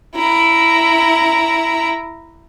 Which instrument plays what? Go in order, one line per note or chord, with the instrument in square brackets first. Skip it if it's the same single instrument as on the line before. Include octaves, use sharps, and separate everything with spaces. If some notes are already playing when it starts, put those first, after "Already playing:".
[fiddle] E4 A#5